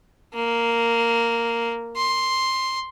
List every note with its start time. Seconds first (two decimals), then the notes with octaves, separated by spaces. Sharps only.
0.34 A#3
1.97 C6